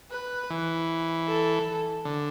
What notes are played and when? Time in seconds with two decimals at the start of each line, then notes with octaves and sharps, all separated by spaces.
0.11 B4
0.50 E3
1.28 A4
2.05 D3